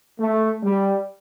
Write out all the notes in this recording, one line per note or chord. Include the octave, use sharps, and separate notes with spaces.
A3
G3